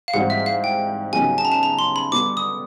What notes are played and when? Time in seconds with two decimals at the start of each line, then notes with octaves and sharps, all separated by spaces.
0.08 F5
0.14 G#2 E3 G3 C4 F#5
0.30 E5
0.46 F5
0.64 G5
1.13 C#3 F#3 B3 D#4 G4 G#5
1.38 A5
1.45 A#5
1.52 A5
1.63 A#5
1.79 C6
1.96 B5
2.12 D3 G3 B3 D6
2.37 D#6